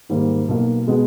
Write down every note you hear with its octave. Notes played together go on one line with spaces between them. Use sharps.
G#2 D#3 G3 A#3
B1 B2 A#3
B2 G#3 B3